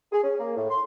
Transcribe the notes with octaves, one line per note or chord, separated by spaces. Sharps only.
G#4
C#4
A#3
A2
C6